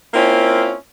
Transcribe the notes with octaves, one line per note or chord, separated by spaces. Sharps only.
A#3 C4 C#4 E4 F4